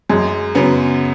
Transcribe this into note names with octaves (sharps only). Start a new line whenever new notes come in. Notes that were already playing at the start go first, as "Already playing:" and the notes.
F#2 G#3
C#3 F#3 B3